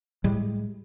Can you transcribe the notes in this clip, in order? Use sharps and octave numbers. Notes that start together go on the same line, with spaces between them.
A2 G3 G#3